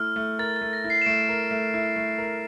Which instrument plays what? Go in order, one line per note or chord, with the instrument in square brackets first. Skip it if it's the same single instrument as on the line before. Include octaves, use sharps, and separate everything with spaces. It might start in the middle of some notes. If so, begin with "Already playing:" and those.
Already playing: [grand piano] A3 E4 [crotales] F6
[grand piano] A3
[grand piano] A#4 [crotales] A6
[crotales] A6
[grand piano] A3
[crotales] A#6
[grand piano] E4
[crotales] C7
E7
[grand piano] A3 [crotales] D7
[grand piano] A#4
A3
E4
A3
A#4